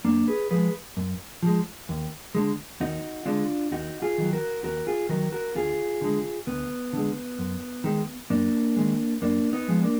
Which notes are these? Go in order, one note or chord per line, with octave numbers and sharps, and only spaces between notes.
F#2 A#3 D4
G#4 B4
F3 G#3 G#4 B4
F#2
F3 G#3
D#2
D3 G#3
D#2 D#4 F#4
D3 G#3 D4 F4
D#2 D#4 F#4
F4 G#4
D#3 F#3
F#4 A#4
D#2 F#4 A#4
F4 G#4
D#3 F#3 F#4 A#4
F#4 A#4
D2 F4 G#4
D3 G#3
D2 B3
D3 G#3
F#2
D#3 G#3
F#2 A#3 D4
D#3 G#3
F#2 A#3 D4
B3 D#4
F3 G#3
A#3 D4